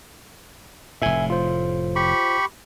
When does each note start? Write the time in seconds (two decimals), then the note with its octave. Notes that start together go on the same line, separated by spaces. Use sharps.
1.02 F1 A2 E5 G#5
1.30 F4 C5
1.96 G4 B5 C#6